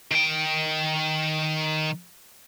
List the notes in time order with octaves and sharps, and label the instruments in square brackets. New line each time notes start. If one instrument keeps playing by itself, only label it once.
[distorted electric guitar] D#3 G5